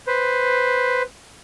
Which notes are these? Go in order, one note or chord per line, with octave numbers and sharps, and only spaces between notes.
B4 C5